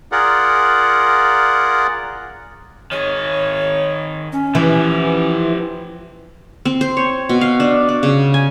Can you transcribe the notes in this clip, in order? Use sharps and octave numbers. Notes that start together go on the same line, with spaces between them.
F4 G#4 A#4 D5 F#5
D#3 G#4 C#5
C#4
E3 F3 G4
C4
C5
C#5
B2
F5
D4
D5
C#3
G#5